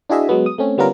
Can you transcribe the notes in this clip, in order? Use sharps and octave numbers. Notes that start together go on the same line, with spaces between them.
D4 E4 F#4 G#4 D#5 E5
F#3 G#3 B3 F#4
D#6
A3 C4 C#4
D3 G3 B3 C#4 F4 A#4